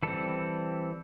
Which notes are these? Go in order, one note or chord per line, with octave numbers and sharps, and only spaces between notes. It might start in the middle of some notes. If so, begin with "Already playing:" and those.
E3 G3 C4 A4